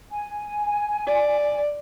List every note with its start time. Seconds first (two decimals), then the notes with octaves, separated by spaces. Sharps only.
0.10 G#5
1.07 D5